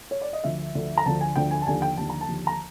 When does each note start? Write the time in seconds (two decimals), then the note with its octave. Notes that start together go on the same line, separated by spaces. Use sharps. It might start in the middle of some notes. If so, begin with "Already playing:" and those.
0.11 C#5
0.21 D5
0.33 D#5
0.44 D2 D3 F3 E5
0.75 D2 D3 F3
0.97 A#5
1.06 D2 D3 F3 A5
1.21 G#5
1.36 D2 D3 F3 G5
1.51 G#5
1.62 A5
1.67 D#2 D3 F3 G#5
1.82 G5
1.97 D#2 D3 F3 A5
2.10 A#5
2.21 A5
2.28 D#2 D3 F3
2.47 A#5